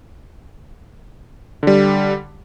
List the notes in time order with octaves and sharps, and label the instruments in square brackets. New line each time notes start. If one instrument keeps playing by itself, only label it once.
[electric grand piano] D3 G3